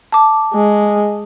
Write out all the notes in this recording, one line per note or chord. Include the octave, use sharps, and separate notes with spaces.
A5 D6
G#3